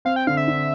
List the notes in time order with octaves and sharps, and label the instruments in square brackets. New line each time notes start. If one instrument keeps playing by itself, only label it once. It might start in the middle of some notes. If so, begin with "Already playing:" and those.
[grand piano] C4 [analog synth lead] F5
[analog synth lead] G5
[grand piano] D3 [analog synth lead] F5
[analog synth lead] E5
[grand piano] D3